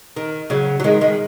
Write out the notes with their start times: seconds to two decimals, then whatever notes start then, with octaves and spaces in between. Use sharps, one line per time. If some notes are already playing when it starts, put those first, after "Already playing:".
0.16 D#3
0.50 C#3 F#3
0.80 F#3
0.84 D#3 G#3
1.01 D#3 G#3